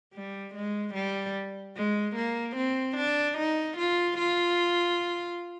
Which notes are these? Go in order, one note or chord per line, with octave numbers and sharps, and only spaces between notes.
G3
G#3
G3
G#3
A#3
C4
D4
D#4
F4
F4